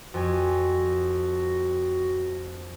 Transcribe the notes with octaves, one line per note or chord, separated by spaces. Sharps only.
F2 F#4 G#5